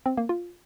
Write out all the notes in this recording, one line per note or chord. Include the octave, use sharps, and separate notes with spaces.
C4
A#3
F4